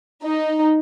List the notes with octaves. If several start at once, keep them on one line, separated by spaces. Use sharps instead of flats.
D#4